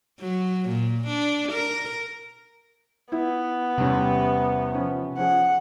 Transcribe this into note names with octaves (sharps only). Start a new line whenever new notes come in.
F#3
A#2
D4
A#4
B3 E4
E2 C3 G3 C#4
F3 C#4
F3 C#4 G#4 F#5